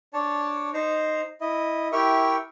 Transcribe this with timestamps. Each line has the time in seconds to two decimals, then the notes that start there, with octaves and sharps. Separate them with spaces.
0.14 D4 C#5 A5
0.74 D#4 C5 A#5
1.41 E4 D#5
1.92 E4 G4 A#4 E5 G5 C#6